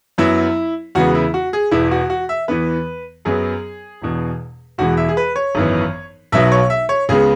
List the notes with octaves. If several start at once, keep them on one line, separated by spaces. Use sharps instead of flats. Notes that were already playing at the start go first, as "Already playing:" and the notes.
F#2 F#3 B3 E4
E2 C#3 G#3 B3 F#4
E4
F#4
G#4
E1 E2 E3 E4
F#4
F#4
E5
E2 E3 B3 B4
F#2 F#3 B3 G#4
E1 E2 B2
E1 E2 E3 G#3 B3 F#4
E5
G#4
B4
C#5
G#1 F#2 E3 B3
B1 B2 F#3 B3 E5
C#5
E5
C#5
C#2 C#3 G#3 B3 G#4